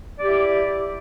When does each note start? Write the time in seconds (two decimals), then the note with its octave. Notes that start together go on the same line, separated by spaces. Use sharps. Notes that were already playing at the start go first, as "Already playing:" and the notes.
0.19 D5
0.23 G4
0.27 E4